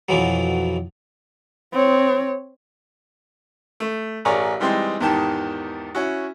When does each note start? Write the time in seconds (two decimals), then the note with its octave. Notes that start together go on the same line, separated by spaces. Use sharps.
0.09 F2 B2 E3 F#3
1.72 C4 C#5
3.80 A3
4.25 A1 G#4 A#4 C#5 D5
4.60 E3 G3 G#3 C4 D#4
5.00 E2 G#2 D#3 G4 A5
5.95 C#4 E4 F#4